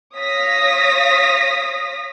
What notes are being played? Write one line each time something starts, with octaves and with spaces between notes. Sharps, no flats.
C#5 F5 D#6 A#6 B6